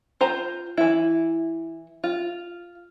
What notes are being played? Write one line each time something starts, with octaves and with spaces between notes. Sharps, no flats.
F4 C5 A#5
E3 E4
F4